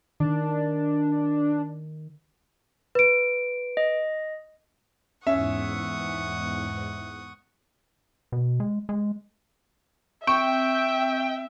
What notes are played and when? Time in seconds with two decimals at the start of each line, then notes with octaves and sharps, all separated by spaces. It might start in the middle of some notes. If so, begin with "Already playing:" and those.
0.20 D#3 D4
2.95 B4 D7
3.77 D#5
5.27 E2 G#2 C#4 E5 F#5 C#6 D#6
8.32 B2
8.60 G#3
8.89 G#3
10.27 C4 E5 G5 C#6